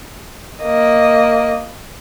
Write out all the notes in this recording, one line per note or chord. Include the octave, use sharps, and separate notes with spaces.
A#3 D#5